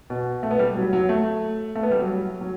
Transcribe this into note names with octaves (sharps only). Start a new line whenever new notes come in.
B2
A3
B3
G3
F#3
F#3
A3
A3
B3
G3
F#3
F#3